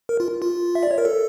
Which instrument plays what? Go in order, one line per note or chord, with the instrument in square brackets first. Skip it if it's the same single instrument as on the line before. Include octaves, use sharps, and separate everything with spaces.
[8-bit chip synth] A#4
F4
F4
E5
D5
C#5
A#4
A4